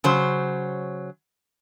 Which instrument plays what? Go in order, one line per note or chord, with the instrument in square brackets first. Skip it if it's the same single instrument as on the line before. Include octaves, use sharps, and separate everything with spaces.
[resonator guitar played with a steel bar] C#3 F#3 C5